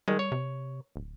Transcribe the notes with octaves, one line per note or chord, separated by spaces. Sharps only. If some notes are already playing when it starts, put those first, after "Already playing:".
D#3 G3 G#3
C#5
C3
D1